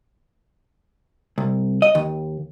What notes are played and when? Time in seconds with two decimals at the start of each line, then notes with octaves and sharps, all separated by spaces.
1.38 C2
1.82 D#5
1.95 D#2